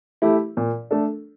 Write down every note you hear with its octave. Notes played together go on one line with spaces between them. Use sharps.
A3 E4 G4
A#2
A3 D4 A4